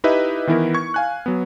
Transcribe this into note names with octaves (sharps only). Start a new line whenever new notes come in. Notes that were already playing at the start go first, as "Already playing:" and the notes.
D#4 E4 G4 B4 D#5 E5
D#3 E3 B3 E4 A#4
C#6 G#6
F5 G#5 F#6
F#3 B3